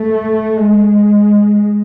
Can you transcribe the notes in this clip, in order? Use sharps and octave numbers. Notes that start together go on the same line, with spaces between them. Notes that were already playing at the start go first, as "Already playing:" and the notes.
Already playing: A3
G#3